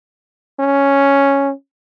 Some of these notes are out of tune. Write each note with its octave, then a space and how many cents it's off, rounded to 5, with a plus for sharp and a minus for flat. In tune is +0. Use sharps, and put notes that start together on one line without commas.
C#4 +0